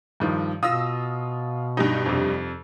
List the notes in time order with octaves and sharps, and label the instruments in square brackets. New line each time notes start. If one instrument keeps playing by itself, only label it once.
[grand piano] G2 D#3 F3
[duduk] B2 [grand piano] F4 [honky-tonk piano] D#6 E6 A#6
[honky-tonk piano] G2 G3 D#4
[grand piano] F2 C3